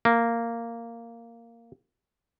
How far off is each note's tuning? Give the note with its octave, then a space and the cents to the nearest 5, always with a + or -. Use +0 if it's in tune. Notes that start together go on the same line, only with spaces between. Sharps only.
A#3 -10